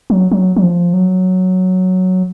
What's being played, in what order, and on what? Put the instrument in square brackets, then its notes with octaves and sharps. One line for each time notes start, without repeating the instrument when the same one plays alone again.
[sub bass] F#3
F#3
F#3
F3
F#3